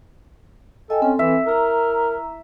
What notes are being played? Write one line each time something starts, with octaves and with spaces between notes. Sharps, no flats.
A4 D#5 G5 G#5
C4 C#4 A4
E3 E5
E4 A#4 A#5